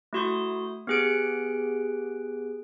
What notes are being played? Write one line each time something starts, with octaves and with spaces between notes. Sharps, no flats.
A3 E4 F#4 C6 D#6 G6
B3 G4 G#4 F#6 D7